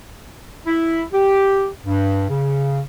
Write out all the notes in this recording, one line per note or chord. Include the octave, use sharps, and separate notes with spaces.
E4
G4
G2
C#3